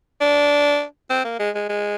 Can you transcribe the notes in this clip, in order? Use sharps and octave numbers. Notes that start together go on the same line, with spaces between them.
D4
C4
A#3
G#3
G#3
G#3